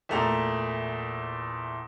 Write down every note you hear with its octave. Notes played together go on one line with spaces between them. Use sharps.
E2 A#2 A3 A#5 F7